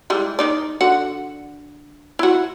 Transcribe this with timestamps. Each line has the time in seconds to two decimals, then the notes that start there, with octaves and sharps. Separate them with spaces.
0.10 E3 G3 G#3
0.39 D#3 D#4 D5
0.81 D3 F#4 F#5
2.19 E4 F#4